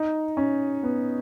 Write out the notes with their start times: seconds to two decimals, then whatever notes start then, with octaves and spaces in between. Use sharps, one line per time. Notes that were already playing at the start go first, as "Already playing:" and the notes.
Already playing: D#4
0.37 C#4
0.83 B3